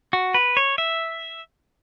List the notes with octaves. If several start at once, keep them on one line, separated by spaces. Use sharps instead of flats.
F#4
B4
C#5
E5